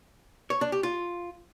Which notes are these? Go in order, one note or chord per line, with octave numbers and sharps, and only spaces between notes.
C#5
D4
G4
F4